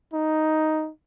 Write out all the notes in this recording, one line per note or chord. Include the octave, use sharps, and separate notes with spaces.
D#4